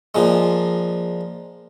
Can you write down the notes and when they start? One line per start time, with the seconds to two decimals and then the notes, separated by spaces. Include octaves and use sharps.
0.15 A#2 F3 G#3